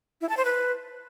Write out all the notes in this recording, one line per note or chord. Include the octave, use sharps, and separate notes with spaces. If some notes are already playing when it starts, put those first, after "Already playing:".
E4
A5
C5
B4